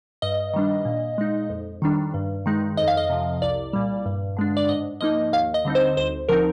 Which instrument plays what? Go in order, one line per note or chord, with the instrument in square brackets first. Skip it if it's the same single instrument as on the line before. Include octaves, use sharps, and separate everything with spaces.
[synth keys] G2 D#5
D#3 G3 D4
A#2
G#3 D#4
F2
D#3 G3 D4
G2
D#3 G#3 D#4
F2 D#5
F5
D#5
C3 F3
C2 D5
A#2 G3
G2
D3 G#3 D4
D5
G#2 D#5
F3 A#3 D#4 D#5
D#2 F5
D#5
D3 G3 C4 D#4
C5
D2 C5
D3 F3 C4 D#4 A#4